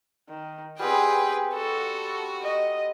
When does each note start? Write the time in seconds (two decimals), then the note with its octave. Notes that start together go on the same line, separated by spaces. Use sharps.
0.29 D#3
0.79 G3 B3 C4 G#4 B4 G5
1.54 F#4 A4
2.43 D#5